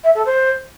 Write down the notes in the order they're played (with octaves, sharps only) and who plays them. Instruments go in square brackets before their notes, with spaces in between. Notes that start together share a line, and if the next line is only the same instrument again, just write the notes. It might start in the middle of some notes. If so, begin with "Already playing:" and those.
[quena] E5
A4
C5